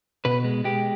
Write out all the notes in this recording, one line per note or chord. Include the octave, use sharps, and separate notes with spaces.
B2 B4
G#3
G#3 G4